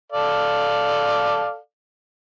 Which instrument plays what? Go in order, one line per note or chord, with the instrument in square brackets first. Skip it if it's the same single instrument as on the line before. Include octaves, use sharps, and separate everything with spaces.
[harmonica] A4 D5 F5